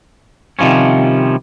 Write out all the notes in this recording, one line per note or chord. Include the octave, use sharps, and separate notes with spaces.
C3 D#3 F3 G3 C#4